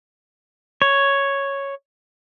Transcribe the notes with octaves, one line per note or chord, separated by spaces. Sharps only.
C#5